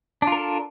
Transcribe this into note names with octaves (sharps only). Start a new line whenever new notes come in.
D4 F4 A4 A#4